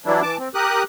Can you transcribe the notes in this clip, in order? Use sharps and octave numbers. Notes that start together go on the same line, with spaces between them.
E3 F#3 G3 D4 E4
E3 A5 D6
C4
G4 A#4 D#6 F#6